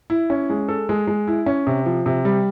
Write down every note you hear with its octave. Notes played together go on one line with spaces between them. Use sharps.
E4
C#4
G#3
A4
G#3
G#3
E4
C#4
C3
F3
C3
G3